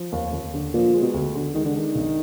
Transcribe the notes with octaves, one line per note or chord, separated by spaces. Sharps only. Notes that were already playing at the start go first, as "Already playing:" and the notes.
Already playing: F3
D#2
D#2
D3
A#2 F3
G#3
B2
D2
D3
D#3 G#3
D3
D#3 D4
B1